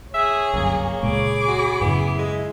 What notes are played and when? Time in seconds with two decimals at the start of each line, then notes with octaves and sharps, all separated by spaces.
0.14 G#4 C#5 E5
0.53 G1 C2 F#2 A#3
1.03 C#2 A#2 G#3 G#4 B5 D6
1.48 F#4
1.81 F#2 A2 C#3 B3 E4
2.19 G#3